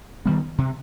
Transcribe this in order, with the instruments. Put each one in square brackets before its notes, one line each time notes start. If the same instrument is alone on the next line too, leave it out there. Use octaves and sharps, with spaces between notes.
[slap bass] D#3 G3 B3
C3